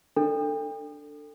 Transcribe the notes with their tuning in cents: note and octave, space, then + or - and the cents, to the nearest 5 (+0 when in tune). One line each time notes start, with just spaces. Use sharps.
D4 +0 A4 +20